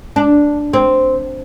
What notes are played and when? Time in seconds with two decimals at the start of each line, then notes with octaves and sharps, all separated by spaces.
0.16 D4
0.73 C4